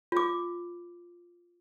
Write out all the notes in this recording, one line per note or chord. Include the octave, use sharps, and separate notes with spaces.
F4 D6